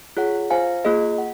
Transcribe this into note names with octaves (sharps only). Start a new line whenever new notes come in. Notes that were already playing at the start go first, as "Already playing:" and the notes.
F4 G#4 C#5 F#5
F4 C5 F5 G#5
A#3 F4 G#4 D#5
F#5